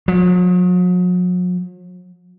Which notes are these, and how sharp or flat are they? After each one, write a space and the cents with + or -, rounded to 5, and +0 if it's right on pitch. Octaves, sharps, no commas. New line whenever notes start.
F#3 -45